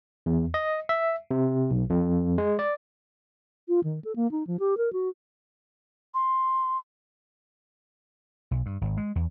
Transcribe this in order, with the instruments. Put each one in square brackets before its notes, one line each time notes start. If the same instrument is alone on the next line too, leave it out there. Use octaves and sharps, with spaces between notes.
[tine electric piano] E2
D#5
E5
C3
B1
F2
G#3
D5
[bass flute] F4
D#3
A4
A#3
D#4
F3
G4
A#4
F#4
[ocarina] C6
[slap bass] B1
G2
G#1
G#3
E2